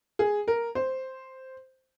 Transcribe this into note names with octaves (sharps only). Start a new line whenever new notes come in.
G#4
A#4
C5